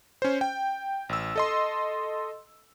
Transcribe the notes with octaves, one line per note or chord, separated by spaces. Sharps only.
C#4 C5
G5
A1 E6
A4 D#5 C6